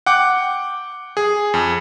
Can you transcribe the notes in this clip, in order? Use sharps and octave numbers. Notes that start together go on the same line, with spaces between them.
F#5 G5 D6
G#4
F2